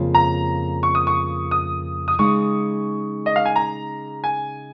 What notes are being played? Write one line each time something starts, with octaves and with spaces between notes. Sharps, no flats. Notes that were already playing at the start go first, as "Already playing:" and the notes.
Already playing: F2 C#3 A#3 F4 C#5
A#5
C#6
D#6
C#6
D#6
D#6
C#3 G#3 D#4 C#6
D#5
F5
G#5
A#5
G#5